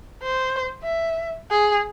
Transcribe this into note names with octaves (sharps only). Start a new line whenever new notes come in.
C5
E5
G#4